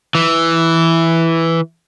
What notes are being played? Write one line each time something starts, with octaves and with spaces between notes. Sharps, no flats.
E3